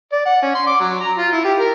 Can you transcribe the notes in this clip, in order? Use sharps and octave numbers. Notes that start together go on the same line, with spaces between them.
D5
F#5
C#4
C6
D6
F#3
A#5
F4
E4
G4
A#4